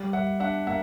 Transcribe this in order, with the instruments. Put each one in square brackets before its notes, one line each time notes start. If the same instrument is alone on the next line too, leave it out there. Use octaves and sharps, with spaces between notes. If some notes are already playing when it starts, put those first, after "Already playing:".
Already playing: [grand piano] G3
G3 E5 F#5
D4 E5 F#5
A#3 E5 F#5